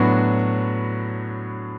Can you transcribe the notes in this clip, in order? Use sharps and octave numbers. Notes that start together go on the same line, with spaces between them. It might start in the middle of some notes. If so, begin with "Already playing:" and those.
Already playing: A2 F#3 B3 D4 F#4